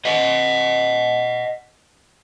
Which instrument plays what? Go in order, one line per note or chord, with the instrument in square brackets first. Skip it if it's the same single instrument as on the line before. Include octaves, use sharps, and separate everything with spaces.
[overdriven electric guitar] D#5 F#5